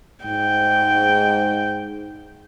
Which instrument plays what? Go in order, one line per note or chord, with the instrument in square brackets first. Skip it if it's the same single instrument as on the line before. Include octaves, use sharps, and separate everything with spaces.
[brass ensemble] G#2 [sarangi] G5